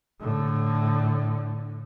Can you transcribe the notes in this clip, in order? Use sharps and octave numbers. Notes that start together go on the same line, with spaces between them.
A2 D3